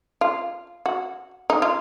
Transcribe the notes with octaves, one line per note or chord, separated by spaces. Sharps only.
F4
F#4
D#4
F4